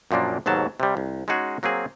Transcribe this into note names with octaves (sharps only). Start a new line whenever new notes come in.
F#2 A#2 F3 A#3 D4
D#2 G#2 B2 F#3 A5
C3 G3
C2
G#3 C#4 D#4 F#4 G#4
F#3 A#3 C4 G#4